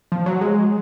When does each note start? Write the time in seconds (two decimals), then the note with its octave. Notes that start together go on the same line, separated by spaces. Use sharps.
0.12 F3
0.26 F#3
0.41 G#3